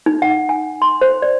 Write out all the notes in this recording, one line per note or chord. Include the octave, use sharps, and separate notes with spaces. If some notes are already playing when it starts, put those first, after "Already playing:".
D#4
F#5
G#5
C6
C5
D5